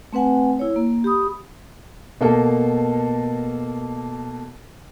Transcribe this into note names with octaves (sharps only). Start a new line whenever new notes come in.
A3 C4 B4 F#5 G#5
E4 C#5
A#3
G4 B5 D#6
B2 A#3 A4